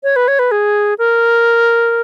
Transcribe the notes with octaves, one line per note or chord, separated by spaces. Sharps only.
C#5
B4
C#5
B4
G#4
A#4